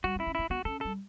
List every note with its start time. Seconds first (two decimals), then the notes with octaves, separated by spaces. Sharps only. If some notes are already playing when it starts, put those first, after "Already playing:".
0.04 G3 F#4
0.16 C#4
0.20 E4
0.27 C#4
0.35 B3 E4
0.50 B3 F#4
0.65 C#4 A4
0.81 G3 A4